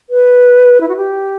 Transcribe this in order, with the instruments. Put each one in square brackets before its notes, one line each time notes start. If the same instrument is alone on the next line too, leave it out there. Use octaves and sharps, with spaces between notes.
[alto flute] B4
E4
F#4
G4